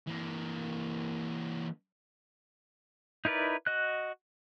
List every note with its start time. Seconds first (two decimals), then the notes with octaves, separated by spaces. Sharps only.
0.07 E3 A#3
3.25 D#4 E4 A#4 B4 D5
3.66 F#4 D#5 F#6